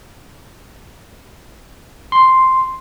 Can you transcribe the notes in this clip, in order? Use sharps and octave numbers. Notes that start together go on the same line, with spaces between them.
C6